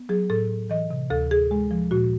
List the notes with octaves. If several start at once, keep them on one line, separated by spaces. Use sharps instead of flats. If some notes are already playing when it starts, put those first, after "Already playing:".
Already playing: B3
F#3 G#4
A2 A4
A2
E3 D#5
C3
D2 A4
D2 G#4
G#3
F3
A#2 F#4